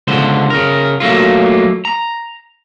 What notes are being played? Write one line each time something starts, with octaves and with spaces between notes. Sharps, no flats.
C#2 D3 C5
C#3 A#4
F#3 A3 A#3 F4
A#5